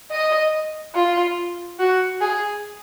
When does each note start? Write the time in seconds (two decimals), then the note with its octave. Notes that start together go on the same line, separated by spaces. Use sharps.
0.11 D#5
0.95 F4
1.79 F#4
2.21 G#4